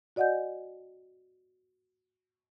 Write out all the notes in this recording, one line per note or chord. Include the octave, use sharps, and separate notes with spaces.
F#4 D5 D#5 F#5 G#5 G6